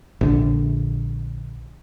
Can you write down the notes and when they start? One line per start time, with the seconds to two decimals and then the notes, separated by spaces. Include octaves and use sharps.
0.21 A#1 D3